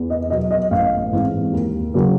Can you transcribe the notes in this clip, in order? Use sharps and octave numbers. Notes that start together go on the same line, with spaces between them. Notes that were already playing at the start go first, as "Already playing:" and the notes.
Already playing: E2
D#5
B2 F#3 D#5
D#5
A1 F5
G#2 E3 G#3 C4
D#2
C#3 F#3 A#3